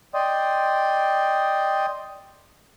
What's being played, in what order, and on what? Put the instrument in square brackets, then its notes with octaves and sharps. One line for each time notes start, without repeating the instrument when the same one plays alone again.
[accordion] D5 D#5 G5 C6 D#6